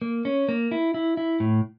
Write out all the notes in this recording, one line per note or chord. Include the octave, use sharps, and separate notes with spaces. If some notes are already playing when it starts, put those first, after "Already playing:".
A#3
C#4
A#3
E4
E4
E4
A2